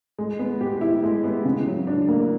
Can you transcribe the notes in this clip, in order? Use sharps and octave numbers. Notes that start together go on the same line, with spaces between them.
G#3
B3
G4
E4
G#3
B3
C#3
F#3
D4
A#3